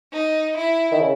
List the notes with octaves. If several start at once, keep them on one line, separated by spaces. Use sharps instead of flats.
D#4
E4
D#3
C#3